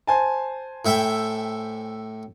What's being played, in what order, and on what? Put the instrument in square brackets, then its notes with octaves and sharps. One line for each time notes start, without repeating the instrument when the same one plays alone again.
[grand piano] C5 G#5 A5
[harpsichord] A2 E5 G5